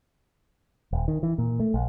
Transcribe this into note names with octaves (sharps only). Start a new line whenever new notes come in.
D#1
D#3
E3
A#2
A3
A#1